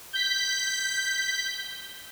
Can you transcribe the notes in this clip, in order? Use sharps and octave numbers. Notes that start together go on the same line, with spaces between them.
G6 B6